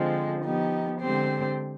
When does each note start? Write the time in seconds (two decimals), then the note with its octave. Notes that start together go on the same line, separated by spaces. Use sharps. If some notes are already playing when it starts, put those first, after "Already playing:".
Already playing: D3 F3 G#3 C4
0.44 F3 B3 D#4 G4
1.00 D3 G#3 C4 G4 C5